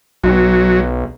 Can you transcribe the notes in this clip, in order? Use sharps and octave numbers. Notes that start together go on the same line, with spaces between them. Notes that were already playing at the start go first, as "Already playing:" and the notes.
B1 F#3